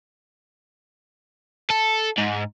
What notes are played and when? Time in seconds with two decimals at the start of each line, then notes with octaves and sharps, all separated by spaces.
1.70 A4
2.18 G#2